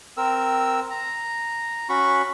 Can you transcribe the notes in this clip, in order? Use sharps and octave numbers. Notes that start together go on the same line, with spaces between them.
C4 A#4 E6
A#5
C#4 F#4 B5 C#6